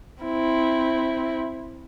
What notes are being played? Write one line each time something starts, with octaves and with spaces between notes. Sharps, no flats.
C4 E4